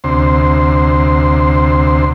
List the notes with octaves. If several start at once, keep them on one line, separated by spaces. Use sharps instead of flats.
D2 C3 C5